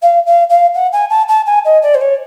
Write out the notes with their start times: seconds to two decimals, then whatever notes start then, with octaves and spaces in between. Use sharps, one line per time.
0.02 F5
0.26 F5
0.49 F5
0.74 F#5
0.92 G#5
1.09 A5
1.28 A5
1.46 G#5
1.64 D#5
1.82 D5
1.94 C5
2.01 C#5